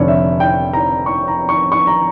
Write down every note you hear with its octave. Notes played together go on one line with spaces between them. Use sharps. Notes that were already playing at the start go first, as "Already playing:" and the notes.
Already playing: F1 F2 D3 C#5 D5
E5
G5
A#5
C#6
A#5
C#6
C#6
A#5